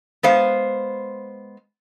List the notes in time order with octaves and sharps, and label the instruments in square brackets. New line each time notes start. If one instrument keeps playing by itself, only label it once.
[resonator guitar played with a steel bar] G#3 B3 C5 F5